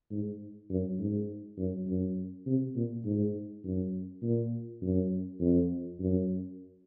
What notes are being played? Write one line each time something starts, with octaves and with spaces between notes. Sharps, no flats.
G#2
F#2
G#2
F#2
F#2
C3
A#2
G#2
F#2
A#2
F#2
F2
F#2